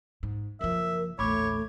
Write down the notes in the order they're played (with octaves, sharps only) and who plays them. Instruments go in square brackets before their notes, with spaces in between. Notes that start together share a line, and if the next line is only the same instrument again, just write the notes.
[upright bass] G#2
[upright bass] F#1 F3 [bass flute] A#4 [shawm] E5
[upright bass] A#1 E2 [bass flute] A3 [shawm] C#5 [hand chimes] B5 D6